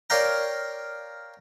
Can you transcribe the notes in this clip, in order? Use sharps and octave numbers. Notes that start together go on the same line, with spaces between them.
A#4 C#5 D5 F5 G5 A#5